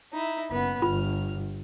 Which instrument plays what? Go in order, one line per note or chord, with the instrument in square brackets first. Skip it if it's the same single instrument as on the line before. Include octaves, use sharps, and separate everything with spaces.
[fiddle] D#4 E4
[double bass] F#1 [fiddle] B3
[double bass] G1 [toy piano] F4 [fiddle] F6